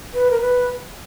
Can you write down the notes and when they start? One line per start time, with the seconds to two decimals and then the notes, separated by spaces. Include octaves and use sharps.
0.14 B4
0.31 A#4
0.41 B4